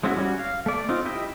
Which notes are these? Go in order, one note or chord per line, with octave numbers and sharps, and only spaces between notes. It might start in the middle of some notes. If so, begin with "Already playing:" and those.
G#3 C4 C#4 E4 F#4
G3 C#4 F#4
F5
A3 D5
C4 D#4 F4
E4 G4 D#5 G5